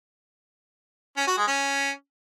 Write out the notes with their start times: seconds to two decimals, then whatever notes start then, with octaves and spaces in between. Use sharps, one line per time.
1.17 C#4
1.27 F#4
1.37 G#3
1.47 C#4